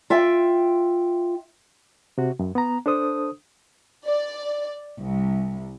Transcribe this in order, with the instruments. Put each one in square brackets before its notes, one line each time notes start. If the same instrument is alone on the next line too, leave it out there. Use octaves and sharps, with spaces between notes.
[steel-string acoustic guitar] F4 E5 G5
[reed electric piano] C3 F#4
F#2
B3 A#5
D4 A4 C5 D#6
[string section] D5
C2